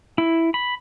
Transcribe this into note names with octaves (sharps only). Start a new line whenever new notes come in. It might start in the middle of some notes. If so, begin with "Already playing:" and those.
E4
B5